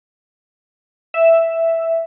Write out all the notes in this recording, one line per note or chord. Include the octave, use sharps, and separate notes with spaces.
E5